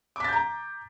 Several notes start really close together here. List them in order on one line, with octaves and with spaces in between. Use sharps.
D6 B6 A6 G6 A#5